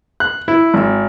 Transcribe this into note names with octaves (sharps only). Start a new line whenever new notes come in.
F#6
E4
G#1